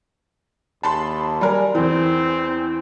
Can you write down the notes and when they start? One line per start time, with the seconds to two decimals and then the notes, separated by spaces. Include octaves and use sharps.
0.83 D#2 A5 B5 C6
1.41 G3 A#4 G#5
1.75 E2 E3 C4